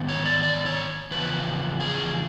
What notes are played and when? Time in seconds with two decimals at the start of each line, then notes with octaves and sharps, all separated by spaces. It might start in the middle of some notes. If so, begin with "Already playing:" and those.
Already playing: G#2 D#3 B3
0.09 C#5
0.25 D5
0.43 D5
0.66 C#5
1.11 E2 C#3 F3 B4
1.80 G#4